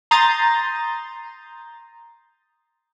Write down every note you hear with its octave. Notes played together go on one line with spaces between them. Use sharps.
A#5 C6 D#6 G6 A6